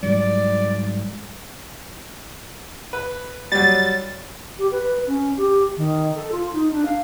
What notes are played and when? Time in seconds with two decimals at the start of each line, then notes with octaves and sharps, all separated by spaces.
0.03 G#2 F#3 G3 D5
2.93 B4
3.52 F#3 G3 A6
4.59 G4
4.71 B4
5.07 C#4
5.37 G4
5.77 D#3
6.15 A4
6.32 F4
6.53 D#4
6.71 D4
6.85 F5